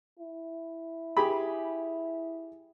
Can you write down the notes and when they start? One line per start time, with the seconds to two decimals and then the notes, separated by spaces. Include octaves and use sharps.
0.19 E4
1.17 G4 G#4 B5